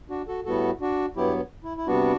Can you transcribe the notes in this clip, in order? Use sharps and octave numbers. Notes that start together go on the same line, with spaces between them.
D4 F#4
F#4 A4
A2 G3 B3 F#4 A4
D4 F#4
G2 F#3 B3 E4 G4
E4
E4
C3 G3 B3 D4 F#4